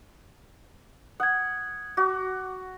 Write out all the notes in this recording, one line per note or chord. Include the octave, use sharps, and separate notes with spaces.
F#5 D#6 G#6
F#4 D6